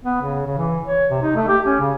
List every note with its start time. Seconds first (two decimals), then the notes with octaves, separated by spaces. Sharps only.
0.04 B3
0.21 C#3
0.46 C#3
0.58 E3
0.85 C#5
1.10 C3
1.22 D#4
1.36 A3
1.48 G4
1.66 C#4
1.80 C#3